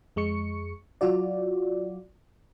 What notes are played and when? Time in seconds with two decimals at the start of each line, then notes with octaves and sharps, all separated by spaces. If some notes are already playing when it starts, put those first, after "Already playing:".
0.16 F2 G#3 C#6 C#7
1.01 F#3 F4 F#4 D5